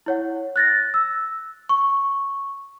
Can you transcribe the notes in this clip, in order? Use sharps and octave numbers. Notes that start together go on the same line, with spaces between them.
E4 C#5 F#5
F#6 A6 A#6
E6
C#6